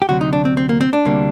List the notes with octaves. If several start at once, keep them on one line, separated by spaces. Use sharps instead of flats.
G4
D2 C3 F#3 F#4
D#4
D4
C4
C4
A#3
C4
D4
D2 C3 G3 A#3